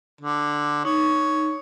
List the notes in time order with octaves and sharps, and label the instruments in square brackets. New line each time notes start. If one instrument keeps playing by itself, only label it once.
[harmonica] D3
[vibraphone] D#4 [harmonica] C#5